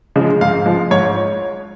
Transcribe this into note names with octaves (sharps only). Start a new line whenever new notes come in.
C#3 F3 G#3
G#2 F5
F3 G#3
G#2 C#5